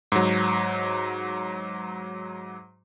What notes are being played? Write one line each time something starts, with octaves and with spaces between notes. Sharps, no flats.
G#2 F#3